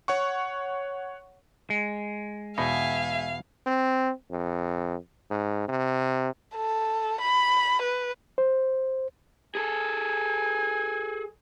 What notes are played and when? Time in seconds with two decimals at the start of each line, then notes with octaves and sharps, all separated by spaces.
0.08 C#5 F#5 C#6
1.70 G#3
2.58 E2 B2 D#4 E5 F5 G#5
3.66 C4
4.31 F2
5.31 G#2
5.69 C3
6.55 A4
7.21 B5
7.82 B4
8.38 C5
9.55 G#4 A4 G#5